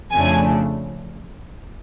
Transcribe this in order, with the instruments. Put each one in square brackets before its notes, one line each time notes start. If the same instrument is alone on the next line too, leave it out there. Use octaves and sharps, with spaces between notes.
[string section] F2 C#3 F3 A3 D4 G#5